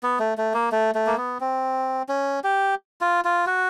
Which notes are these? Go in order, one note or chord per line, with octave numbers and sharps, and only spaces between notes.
B3
A3
A3
A#3
A3
A3
A#3
B3
C4
C#4
G4
F4
F4
F#4